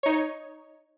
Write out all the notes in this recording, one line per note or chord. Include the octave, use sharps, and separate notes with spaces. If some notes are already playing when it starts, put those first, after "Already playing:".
D#4 C#5